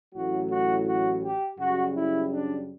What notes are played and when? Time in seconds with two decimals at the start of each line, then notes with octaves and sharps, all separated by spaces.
0.14 A1 A2 F#3 A3 F#4
0.50 F#4
0.86 F#4
1.23 G4
1.59 F#2 C#3 G3 F#4
1.95 E4
2.32 D4